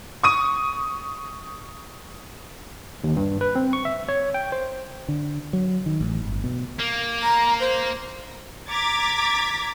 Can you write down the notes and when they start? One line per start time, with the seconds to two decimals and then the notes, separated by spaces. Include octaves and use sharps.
0.23 C#6 D#6 D#7
3.04 D#2
3.16 G2
3.41 B4
3.55 C4
3.73 C#6
3.85 E5
4.09 C#5
4.34 G5
4.52 C5
5.08 D3
5.53 F#3
5.86 D#3
6.01 A1
6.24 G1
6.44 B2
6.80 A#3
7.23 A#5
7.60 C5
8.68 A#5 D6 G#6 A6 B6